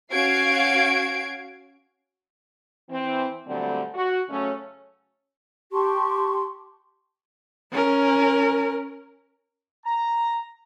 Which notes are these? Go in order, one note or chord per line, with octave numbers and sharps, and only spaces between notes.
C#4 F#4 F5 G#6 C7 D7
E3 C4
A#2 D3 F#3 G3 A3 C4
F#4
C#3 F#3 A3 C#4
G4 A5 C6 C#6
C#4 A#4
A#5